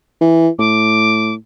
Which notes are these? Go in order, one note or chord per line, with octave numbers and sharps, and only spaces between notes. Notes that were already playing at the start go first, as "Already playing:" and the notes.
E3
A2 D6